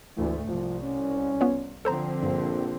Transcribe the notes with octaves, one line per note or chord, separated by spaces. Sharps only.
D2 G#2 E3 A3
C2 F3
C#4
B3 F4 C#5
D3 F3 C4 A4 C5 A#5
A#1 G2